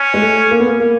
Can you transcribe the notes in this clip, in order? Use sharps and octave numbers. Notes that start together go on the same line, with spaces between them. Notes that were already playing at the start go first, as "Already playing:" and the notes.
Already playing: C#4
G#3
A3
A#3
B3
A#3
A#3